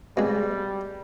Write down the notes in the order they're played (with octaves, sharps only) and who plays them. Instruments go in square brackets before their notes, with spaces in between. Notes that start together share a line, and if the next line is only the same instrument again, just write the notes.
[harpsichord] B2 G#3 [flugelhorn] G3